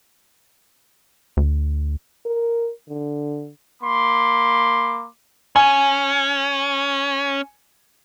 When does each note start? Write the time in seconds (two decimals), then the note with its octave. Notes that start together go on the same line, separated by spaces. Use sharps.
1.37 D2
2.26 A#4
2.89 D3
3.82 A#3 B5 C6 D6
5.56 C#4 G#5